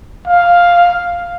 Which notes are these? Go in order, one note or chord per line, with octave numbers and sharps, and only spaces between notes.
F5